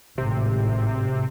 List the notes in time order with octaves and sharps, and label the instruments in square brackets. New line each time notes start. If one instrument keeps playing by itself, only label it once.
[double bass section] G#1 A2 [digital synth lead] C3